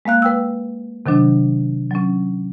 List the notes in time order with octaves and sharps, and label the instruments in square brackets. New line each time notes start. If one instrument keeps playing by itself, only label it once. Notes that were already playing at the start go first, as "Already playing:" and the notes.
[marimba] G#3 A#3 F5 F#6
B4 G5 E6
C3 D#3 F#3 D4
F#3 C#4